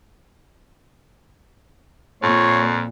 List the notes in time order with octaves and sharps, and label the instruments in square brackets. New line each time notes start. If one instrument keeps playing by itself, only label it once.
[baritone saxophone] F2 [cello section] A#2 [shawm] C#5